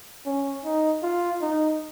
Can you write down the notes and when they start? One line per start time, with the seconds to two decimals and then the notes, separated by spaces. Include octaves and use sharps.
0.26 C#4
0.64 D#4
1.03 F4
1.41 D#4